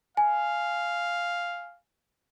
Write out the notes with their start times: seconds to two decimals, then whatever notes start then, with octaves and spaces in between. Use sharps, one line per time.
0.17 F5 G#5